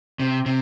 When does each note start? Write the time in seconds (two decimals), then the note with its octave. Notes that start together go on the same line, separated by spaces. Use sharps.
0.20 C3
0.46 C3